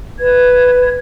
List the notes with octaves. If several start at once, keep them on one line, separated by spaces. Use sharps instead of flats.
B4 G#6